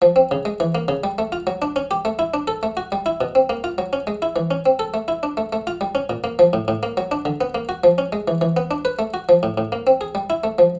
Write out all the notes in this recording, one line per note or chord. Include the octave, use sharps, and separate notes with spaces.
F3
C4
C#3
G#3
E3
A#3
C#3
G3
A3
F4
F#3
D4
C#4
G4
A3
E4
D4
A4
A3
F#4
G3
E4
B2
C4
A#3
F4
F#3
C#4
G#3
E4
E3
C#4
C4
A4
A3
E4
D4
A3
A3
F4
G3
C#4
A#2
A#3
F3
A2
A2
A#3
F#3
D4
D3
B3
A#3
F#4
F3
C#4
G#3
E3
E3
B3
D4
B4
A3
F#4
F3
A2
A2
A#3
C4
G#4
G3
E4
A3
F3